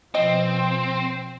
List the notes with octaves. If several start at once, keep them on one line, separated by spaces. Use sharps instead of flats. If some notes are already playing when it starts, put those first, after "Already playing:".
B2 F3 C4 D#5